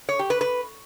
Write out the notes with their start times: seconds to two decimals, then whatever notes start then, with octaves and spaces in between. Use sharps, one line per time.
0.09 C#5
0.19 G4
0.30 B4
0.41 B4